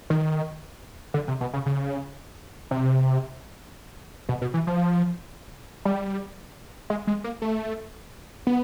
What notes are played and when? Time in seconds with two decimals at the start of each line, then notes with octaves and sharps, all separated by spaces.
0.10 D#3
1.14 D3
1.28 C3
1.41 B2
1.53 C#3
1.66 C#3
2.71 C3
4.29 B2
4.41 B2
4.54 E3
4.67 F3
5.85 G3
6.90 G#3
7.07 G#3
7.24 A#3
7.42 A3
8.47 B3